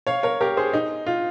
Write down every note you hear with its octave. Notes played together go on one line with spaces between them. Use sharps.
C#5 F5
A#4 C#5
G4 A#4
G#4 C5
D#4
F4